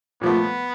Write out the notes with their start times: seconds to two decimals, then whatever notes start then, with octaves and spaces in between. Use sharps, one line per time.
0.21 A#2 F3 A3 B3